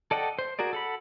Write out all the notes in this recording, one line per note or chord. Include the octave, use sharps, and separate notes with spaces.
A4 D5 D#5 F#5 G5
C5
F#4 G#4 A#4 D5
A4 F#5 B5